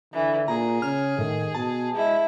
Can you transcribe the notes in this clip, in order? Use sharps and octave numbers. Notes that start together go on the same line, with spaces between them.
D3 E3
A#2 G#4 A#5
C#3 F6
A2 D#3
B2 A5
G#3 E4